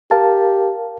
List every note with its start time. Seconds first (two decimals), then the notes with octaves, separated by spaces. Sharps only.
0.11 G4 A#4 F5 A5